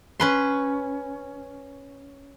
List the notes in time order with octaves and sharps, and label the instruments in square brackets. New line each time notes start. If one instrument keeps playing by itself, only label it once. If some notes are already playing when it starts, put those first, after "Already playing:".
[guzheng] C#4 B4 C6